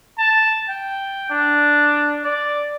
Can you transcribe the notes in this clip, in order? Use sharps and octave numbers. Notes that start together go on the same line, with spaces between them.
A5
G5
D4
D5